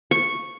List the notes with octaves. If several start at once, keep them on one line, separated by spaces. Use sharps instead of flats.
C#6